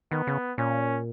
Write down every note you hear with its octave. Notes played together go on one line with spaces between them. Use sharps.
D#3 B3
C#3
A#2 C#4